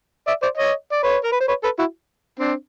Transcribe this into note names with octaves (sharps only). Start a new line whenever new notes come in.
D5 E5
C5 D5
C#5 D#5
D5
B4 C#5
A#4
B4
C5
B4 C#5
A4 B4
E4 F#4
C4 D4